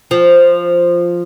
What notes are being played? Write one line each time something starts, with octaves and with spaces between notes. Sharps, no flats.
F3